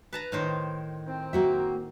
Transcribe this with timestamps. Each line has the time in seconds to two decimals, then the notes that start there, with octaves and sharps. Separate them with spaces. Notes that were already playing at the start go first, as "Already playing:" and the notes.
0.13 B4 A5 A#5
0.32 A2 D#3 C5
1.07 C4 D#4
1.33 A#3 F#4 E5